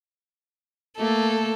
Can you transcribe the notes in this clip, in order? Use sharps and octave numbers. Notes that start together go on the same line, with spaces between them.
A3 A#3 A4